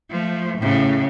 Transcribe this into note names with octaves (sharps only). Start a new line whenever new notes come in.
F3 A3
A2 C#3